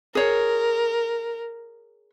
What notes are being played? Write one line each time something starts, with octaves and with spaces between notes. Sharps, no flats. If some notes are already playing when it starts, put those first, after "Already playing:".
G#4 A#4 C#5